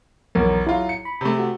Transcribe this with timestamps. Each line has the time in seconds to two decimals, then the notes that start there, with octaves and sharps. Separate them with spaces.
0.35 B1 E2 A#4
0.66 F#3 E4 F4
0.89 C#7
1.05 B5
1.21 C3 A3
1.39 F#4